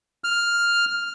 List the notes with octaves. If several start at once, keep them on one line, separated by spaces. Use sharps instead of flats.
F6